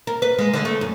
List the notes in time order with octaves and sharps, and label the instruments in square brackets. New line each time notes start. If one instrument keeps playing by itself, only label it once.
[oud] A#4
B4
G#3
D3
A3
F#2